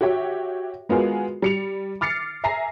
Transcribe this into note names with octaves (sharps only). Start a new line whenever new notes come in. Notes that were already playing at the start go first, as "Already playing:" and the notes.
F#4 G4 C#5 E5 G5
G#3 B3 F4 F#4 G#4 A#4
G3 C#7 F7
D6 F6 A6 C7 C#7
E5 G#5 A#5 A#6 C7